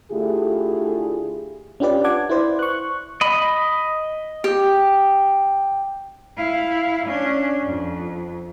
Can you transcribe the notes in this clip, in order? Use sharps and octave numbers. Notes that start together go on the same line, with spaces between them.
D3 A3 E4 F4 G4 G#4
C#4 D4 F4 G4 B4 D5
F#5 A5 D6 G#6
E4 B4 C5 D5
C#6 F#6
D#5 B5
G4
E4 F5
C#4 D4
F2